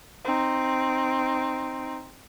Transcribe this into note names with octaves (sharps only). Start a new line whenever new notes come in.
C4 D#4